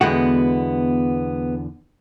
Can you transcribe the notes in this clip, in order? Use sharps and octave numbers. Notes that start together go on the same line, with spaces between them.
E2 D3 G#3 B3 F#4